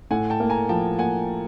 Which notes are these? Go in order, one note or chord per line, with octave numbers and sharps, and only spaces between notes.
A2 F#5 G#5
G5 A5
A#3
G#5 A#5
F3 G5 A5
A#3 F#5 G#5